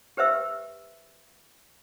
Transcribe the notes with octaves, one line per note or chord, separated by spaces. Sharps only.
G4 B4 C5 E5 E6